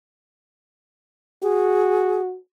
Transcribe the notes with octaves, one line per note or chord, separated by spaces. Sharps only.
F#4 G#4